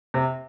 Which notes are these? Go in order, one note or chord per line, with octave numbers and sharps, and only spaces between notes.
C3